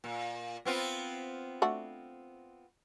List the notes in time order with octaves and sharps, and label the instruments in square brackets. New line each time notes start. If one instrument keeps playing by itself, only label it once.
[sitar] A#2
B3 C4 F4
[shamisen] A3 D4 F#4